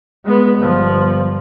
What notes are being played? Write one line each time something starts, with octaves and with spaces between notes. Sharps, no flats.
G#3 B3
G1 F3